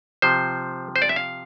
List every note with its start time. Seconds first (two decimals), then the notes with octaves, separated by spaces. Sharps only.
0.22 C3 F3 C5
0.96 C5
1.02 D5
1.09 E5
1.16 F5